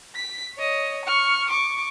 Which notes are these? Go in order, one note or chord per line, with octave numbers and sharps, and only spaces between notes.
B6
C#5 D#5
C#6 F6
C#6 D6